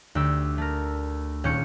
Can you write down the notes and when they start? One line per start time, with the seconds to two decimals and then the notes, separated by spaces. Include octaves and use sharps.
0.15 D2 G4 E6
0.58 A3 A#4
1.44 D#1 C#4 G#4 C#6 G6 C#7